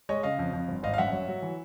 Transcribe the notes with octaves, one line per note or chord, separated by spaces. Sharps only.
G#3 C#5 D#5
C#3 D#5 F5
F2
F2
G1
G#1 D#5 F5
F5
F#2 E5 F#5
F#3
F#3
E3